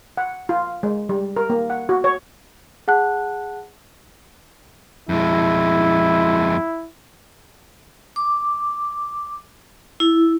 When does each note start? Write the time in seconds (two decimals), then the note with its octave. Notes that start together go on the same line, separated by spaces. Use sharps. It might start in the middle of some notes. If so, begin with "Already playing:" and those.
0.17 F#5
0.49 F4
0.83 G#3
1.09 G3
1.37 A#4
1.50 A#3
1.70 F#5
1.89 F#4
2.04 C#5
2.88 G#4 F#5 A5 F#6
5.09 F2 G#3 E4
8.16 D6
10.00 E4